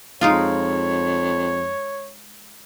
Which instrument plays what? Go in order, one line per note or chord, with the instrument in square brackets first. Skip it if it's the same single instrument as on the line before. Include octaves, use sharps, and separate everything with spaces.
[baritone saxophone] F2 [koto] G#3 D#4 F4 [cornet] C#5